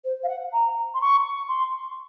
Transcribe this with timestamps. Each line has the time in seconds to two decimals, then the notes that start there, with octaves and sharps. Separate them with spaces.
0.04 C5
0.23 F5
0.28 F#5
0.52 A#5
0.94 C6
1.01 C#6
1.48 C6